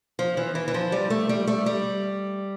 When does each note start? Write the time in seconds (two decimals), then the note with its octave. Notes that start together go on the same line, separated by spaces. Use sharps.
0.19 F3
0.37 E3
0.55 E3
0.68 E3
0.74 F3
0.92 G3
1.10 A3
1.29 G3
1.47 A3
1.66 G3